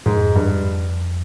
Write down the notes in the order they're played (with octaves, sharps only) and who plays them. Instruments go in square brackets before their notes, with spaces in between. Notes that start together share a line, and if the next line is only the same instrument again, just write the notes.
[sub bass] F2 [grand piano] G#2
[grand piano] G2